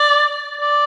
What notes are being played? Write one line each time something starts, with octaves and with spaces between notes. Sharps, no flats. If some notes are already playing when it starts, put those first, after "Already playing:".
Already playing: D5
D5